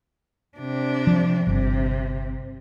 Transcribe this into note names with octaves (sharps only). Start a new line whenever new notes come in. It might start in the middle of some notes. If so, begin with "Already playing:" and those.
C3 D4
F3
G1 C3